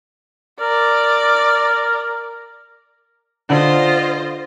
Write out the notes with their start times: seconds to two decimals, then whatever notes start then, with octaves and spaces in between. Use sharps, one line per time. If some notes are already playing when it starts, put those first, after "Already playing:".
0.61 A#4 D5
3.50 D3 F4 C5 D#5